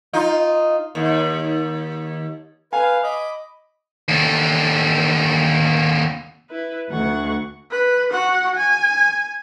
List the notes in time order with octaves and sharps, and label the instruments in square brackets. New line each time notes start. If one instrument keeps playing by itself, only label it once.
[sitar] D#4 F4
D#2
[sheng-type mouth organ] B4 [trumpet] F5 [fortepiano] G#5
[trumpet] D#5 [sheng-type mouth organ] B5 D6
[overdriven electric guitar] D#2 D3
[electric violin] E4 B4
[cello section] D2 [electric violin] F#5 C#6
[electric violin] B4
F#4 F#5
G#5